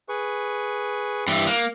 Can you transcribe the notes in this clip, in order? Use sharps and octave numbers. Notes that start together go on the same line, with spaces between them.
G#4 B4 C#6
G2 E3
A#3 F#6